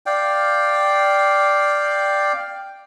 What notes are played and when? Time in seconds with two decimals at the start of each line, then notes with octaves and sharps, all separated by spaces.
0.06 D5 F5 G5